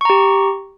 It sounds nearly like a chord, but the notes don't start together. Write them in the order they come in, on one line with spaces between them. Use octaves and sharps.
C#6 A#5 G4